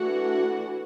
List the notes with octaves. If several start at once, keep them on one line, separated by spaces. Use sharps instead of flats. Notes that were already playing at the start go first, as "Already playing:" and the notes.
Already playing: E3 A3 D4 F#4 F#5